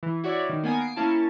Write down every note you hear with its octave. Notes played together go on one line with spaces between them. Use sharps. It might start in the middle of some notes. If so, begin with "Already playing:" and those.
E3
E4 F#4 C#5 D5
D#3
A#3 B3 G#5 D#6
C7 D7
A#3 C#4 E4 A5